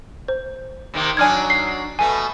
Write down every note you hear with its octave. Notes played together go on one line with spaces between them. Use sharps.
C5
C3 D#3 A#3
F#3 D4 D#4 G#5 F6 G#6
C7
B2 A3 G#5